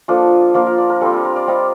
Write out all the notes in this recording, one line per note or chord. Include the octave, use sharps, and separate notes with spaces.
F3 A#3 D4 F4 A4
F3 A#3 D4 F4 A#4
A#4
D5
A#4
G3 C4 F4 A4
A#4
A#4
D5
G3 C4 F4 D#5